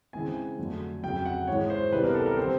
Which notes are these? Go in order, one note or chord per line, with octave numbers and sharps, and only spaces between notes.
C#3 E3 G#3 C4 G#5
F2 D3 F#3 A3
F2 C#3 F#3 G5
F#5
G#2 E3 G#3 C#5
C5
C3 E3 G3 B3 D4 B4
A#4
A4
A#4
D3 G3 C4 C5